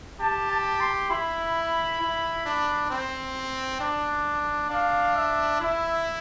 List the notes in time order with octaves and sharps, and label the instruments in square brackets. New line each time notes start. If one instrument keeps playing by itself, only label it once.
[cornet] G4 [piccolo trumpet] A5
[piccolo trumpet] A5
C6
[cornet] E4 [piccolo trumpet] B5
[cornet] E4
D4
C4
D4
[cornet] D4 [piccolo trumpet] F5
[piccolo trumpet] E5
[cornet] E4 [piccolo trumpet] E5